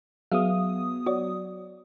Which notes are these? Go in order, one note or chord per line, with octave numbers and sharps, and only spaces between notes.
F#3 B3 G#4 E5 F5 D#6
F#4 C#5 D5